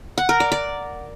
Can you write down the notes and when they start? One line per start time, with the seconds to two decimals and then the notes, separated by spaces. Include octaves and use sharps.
0.18 F#5
0.29 A#4
0.40 D5
0.52 D5